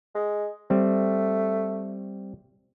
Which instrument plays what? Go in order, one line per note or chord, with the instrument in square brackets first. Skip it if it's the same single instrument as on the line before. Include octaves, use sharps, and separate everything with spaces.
[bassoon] G#3
[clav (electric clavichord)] G3 C4 [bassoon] A3